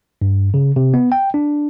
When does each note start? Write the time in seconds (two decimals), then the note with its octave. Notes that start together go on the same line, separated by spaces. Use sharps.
0.22 G2
0.54 C#3
0.76 C3
0.94 B3
1.12 G5
1.34 D4